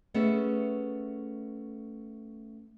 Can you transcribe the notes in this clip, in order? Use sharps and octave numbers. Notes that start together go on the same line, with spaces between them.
A3 B3 C#4 G#4 E5